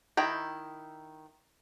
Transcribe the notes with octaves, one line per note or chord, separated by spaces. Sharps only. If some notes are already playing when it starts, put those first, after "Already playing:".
D#3 E4 G5 A#5